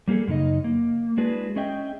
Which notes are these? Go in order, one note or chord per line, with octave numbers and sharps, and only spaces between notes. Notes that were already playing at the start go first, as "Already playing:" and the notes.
G3 A#3 E4 G#4 A4
F#2 C#3 D#4 D#5
A#3
G#3 D4 E4 F#4 G#4 B4
C#4 G#4 D#5 E5 G5